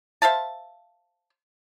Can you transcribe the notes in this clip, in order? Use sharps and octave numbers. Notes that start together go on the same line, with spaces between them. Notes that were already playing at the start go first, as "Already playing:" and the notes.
C5 E5 F5 A5